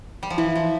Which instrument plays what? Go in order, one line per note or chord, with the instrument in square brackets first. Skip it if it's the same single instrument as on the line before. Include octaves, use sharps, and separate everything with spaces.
[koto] G3
F3
[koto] E3 [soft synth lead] E4
[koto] F3